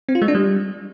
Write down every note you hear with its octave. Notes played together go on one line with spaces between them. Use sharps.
C4
F4
G#3
D4
G3